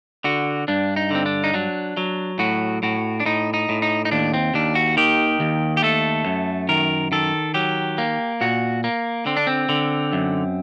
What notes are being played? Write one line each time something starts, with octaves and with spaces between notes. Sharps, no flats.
D3 F#4
G2 D4
D#4
D3 C4
D4
D#4
F#3 D4
F#3
A2 F#4
A2 F#4
D4
A2 D#4
D#4
A2
D#4
D#4
D#2 D4
C4
D#2 D4
F#4
D#3 G4
D#2
G4
A3 A4
F#2
D#3 A#4
D#3 A4
F#3 G4
A#3
A#2 F#4
A#3
D3 C4
D4
C4
D3
F#2